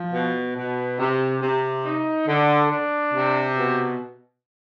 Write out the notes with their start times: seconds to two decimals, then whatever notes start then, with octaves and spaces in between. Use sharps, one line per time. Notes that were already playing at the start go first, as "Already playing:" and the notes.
Already playing: F3
0.13 B2
0.56 B2
0.99 C3
1.41 C3
1.85 D#4
2.28 D3
2.71 D4
3.13 C3
3.57 B2